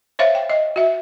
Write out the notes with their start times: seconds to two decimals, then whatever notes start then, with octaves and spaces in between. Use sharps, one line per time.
0.19 C5 C#5 E5 F5
0.35 G5
0.50 D#5
0.76 F#4 E5